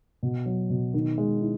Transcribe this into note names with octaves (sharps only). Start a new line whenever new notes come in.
B2
F#3
B2
D#3
G#3
E4